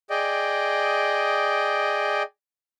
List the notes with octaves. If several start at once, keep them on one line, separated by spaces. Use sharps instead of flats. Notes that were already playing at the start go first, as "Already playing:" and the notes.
G#4 D5 D#5 G5